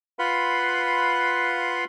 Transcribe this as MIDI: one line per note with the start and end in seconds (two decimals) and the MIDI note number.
0.19 1.84 65
0.19 1.84 71
0.19 1.84 77
0.19 1.84 78
0.19 1.84 83
0.19 1.84 84